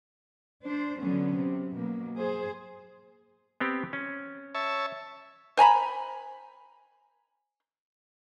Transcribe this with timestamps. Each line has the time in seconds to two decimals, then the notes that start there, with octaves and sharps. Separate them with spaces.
0.65 D4 C5
1.00 D3 F#3 B3 C#4
1.35 C3
1.74 B2 F#3 A#3
2.18 G#4 C5
3.60 B3 C4 G4
3.93 C#4
4.55 C#5 E5 A5
5.57 C5 G#5 A#5 B5